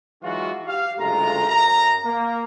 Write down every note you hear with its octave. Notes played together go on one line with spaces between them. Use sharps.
E3 F#3 G#3 D#4 F4 F#4
G4 F5
F#1 D2 G#3 A3 F4 A#5
F#2 A#5
A#3